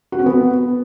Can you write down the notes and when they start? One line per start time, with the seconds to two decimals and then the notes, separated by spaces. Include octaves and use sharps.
0.12 F#4
0.19 C4
0.26 B3